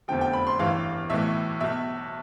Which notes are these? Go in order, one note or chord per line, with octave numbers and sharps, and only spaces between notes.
F1 E2 D3 F3 G5
G5
B5
C6
G1 G2 E3 F5
B1 A2 E3 E5
B1 B2 E5